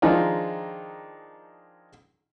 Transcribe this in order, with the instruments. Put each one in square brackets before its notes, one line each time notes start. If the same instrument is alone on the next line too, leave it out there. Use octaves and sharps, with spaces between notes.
[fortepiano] D#3 F3 G#3 D4 D#4 F4